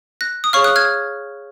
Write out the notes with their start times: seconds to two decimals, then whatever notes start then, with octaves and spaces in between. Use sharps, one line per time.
0.21 F#6 A#6
0.44 D#6
0.53 G#4 C#5 F5 C#6 F6
0.64 D#6 F#6
0.76 F6 G#6